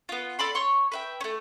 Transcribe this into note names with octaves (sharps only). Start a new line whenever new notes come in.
B3 F4
A4 D5 B5 C6
C#5 C6 C#6
B4 E5 G5
A3 C#4